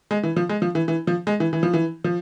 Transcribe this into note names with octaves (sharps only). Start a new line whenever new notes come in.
G#3
E3
F3
G#3
F3
E3
E3
F3
G#3
E3
E3
F3
E3
F3